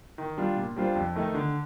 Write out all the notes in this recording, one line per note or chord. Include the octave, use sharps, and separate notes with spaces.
D#3
G3 D4 F4
A#2
G3 D4 F4 C5
F2
D#3 A3 D#4
D3